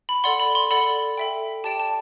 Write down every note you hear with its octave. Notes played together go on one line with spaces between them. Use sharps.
B5
A4 D5 F#5 C6
B5
C6
A4 D5 F#5 B5
A4 E5 G5
G4 D5 G5 A5
A5